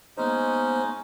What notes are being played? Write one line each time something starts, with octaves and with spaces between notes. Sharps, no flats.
G#3 A#3 B3 C#4 D#4 C5